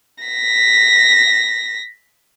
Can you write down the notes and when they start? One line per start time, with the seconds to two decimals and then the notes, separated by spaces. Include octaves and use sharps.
0.24 A#6 B6